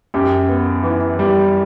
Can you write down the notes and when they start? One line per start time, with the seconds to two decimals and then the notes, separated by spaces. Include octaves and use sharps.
0.14 F#2 G4
0.48 B3
0.83 E3
1.19 G3